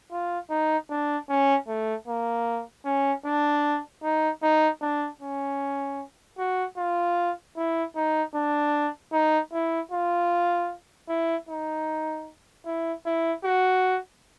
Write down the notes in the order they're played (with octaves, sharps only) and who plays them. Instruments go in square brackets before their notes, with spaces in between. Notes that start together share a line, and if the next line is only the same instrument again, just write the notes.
[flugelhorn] F4
D#4
D4
C#4
A3
A#3
C#4
D4
D#4
D#4
D4
C#4
F#4
F4
E4
D#4
D4
D#4
E4
F4
E4
D#4
E4
E4
F#4